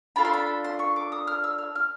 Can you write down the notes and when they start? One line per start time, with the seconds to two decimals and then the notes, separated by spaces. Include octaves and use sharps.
0.16 D4 F4 A4 B5
0.25 C6
0.34 B5
0.64 C6
0.79 C#6
0.96 D6
1.12 D#6
1.27 F6
1.44 E6
1.58 F6
1.75 F6